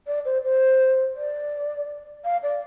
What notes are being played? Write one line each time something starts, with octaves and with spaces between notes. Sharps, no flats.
D5
C5
C5
D5
F5
D5